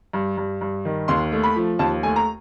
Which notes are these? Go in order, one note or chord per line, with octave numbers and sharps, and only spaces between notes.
G2
G2
G2
D#3
D#2 C6
A3
B5
F3
D#2 A5
A3 G#5
A#5